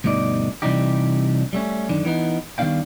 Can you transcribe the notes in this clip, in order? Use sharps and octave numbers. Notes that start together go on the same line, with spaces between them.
D2 G2 B2 D#4 D5
C3 E3 G3 D4 D#4 G4
G3 A3 C#4
F#2 D3 D#3 D4
E3 B3 D#4
D#3 G3 B3 D4 F5 G5